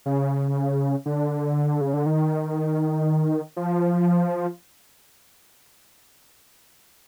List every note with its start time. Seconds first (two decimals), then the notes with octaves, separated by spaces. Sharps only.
0.06 C#3
1.06 D3
1.81 C#3
1.94 D3
2.06 D#3
3.57 F3